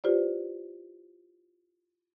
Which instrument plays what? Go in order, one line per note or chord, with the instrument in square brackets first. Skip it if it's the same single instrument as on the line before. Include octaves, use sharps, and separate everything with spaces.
[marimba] E4 F4 G4 B4 C5 D5